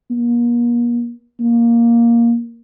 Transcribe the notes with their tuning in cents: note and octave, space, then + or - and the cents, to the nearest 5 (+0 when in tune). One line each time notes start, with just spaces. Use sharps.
A#3 +40
A#3 +5